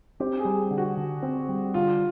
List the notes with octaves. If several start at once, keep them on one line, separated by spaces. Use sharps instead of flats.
C4 G4
G#4
G3
D3
F#4
D3
C4
G3
D3 F4